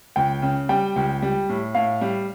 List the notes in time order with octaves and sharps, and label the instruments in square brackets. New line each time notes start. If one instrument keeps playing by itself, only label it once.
[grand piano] C#2 [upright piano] G5
[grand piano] C#3
[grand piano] G3 [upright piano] G5
[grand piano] C#2
G3
A2
[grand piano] A2 [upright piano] F5
[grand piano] G3